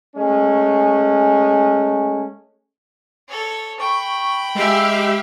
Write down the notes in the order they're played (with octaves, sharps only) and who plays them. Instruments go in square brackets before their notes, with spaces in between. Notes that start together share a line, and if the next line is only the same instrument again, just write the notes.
[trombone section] G#3 A3 C#4
[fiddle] A4 C#5
[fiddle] G5 B5 [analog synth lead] C#6
[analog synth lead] G#3 [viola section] G4 E5 F5